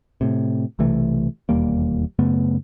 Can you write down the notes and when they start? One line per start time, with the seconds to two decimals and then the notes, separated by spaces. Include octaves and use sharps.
0.21 A2 C3
0.79 B1 C3 E3 A3
1.49 E1 D#2 G3 A#3
2.19 F#2 C#3 A3 B3